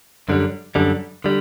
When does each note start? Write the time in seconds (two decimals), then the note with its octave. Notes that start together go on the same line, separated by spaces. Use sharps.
0.29 F#2 D3 G3
0.75 F#2 D3 G3
1.24 D3 G3